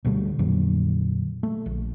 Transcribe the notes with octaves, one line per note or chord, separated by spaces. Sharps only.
D2 B2 G3 A3
F2 A#2 D3 F#3
A3
A#1